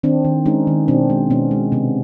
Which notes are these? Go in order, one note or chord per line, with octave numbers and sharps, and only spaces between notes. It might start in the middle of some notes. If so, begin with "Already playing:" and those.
D#3 C4 D4
D#3
G#3 C#4 D#4
D#3
B2 C4 D4
G#3
B2 B3 C#4
G#3
C3 B3